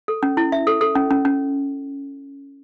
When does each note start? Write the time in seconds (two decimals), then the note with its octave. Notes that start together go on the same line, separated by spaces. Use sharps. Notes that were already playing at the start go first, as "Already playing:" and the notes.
0.08 A4
0.23 C#4
0.37 E4
0.52 E5
0.67 A4
0.81 A4
0.95 C#4
1.11 C#4
1.25 C#4